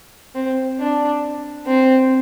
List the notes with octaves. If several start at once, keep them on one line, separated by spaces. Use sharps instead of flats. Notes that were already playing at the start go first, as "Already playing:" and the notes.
C4
D4
C4